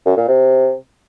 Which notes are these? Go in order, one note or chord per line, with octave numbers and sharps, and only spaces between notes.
F#2
A#2
C3